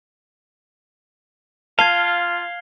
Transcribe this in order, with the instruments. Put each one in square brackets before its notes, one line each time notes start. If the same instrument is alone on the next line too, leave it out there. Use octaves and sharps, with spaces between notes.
[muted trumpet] F4 [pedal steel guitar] F5 [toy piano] A5 [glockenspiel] G#6 C7 G7